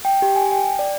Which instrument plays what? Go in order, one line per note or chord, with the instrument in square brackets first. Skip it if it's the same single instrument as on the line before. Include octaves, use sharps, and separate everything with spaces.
[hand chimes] G5
G4
G#5
G5
D5